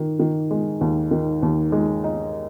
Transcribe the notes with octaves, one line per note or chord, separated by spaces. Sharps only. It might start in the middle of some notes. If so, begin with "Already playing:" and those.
Already playing: D#3 D#4
D#3
G#3
D#2
D#3
D#2
G#3
D#4